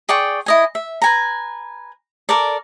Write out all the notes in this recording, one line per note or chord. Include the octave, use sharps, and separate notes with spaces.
G#4 D5 G5 C#6
E4 D#5 G#5
E5
B4 G#5 A#5
A4 A#4 D5